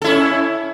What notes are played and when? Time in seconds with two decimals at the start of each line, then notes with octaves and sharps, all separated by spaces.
0.02 A4
0.04 E4
0.07 C#4